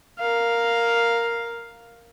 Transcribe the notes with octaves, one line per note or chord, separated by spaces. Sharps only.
A#4 F5